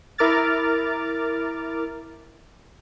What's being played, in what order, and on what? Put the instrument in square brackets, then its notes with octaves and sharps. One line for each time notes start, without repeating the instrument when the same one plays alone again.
[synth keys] E4 A#4 D6 F6 A6